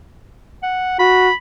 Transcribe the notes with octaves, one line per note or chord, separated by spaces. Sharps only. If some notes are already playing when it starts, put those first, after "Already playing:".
F#5
F#4 B5